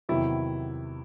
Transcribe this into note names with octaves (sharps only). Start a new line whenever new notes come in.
E2 C3 D#3 F#3 E4